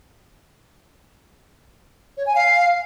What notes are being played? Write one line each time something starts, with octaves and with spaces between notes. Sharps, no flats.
C#5
G#5
F5